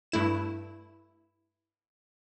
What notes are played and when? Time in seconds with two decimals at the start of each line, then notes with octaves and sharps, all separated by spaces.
0.12 G2 A3 E4 E7